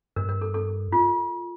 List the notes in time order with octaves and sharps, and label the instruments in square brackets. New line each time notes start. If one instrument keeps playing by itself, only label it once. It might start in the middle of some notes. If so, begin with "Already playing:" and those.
[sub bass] G2 [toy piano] A#4
[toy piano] A#4
A4
A4
F4